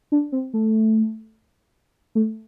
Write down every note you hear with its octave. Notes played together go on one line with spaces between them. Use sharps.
D4
C4
A3
A3